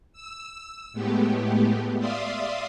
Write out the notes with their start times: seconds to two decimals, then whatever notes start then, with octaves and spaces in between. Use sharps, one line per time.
0.13 E6
0.93 A2 G#3 A3 B3 G4
1.98 D5 E5 F5 C6 D#6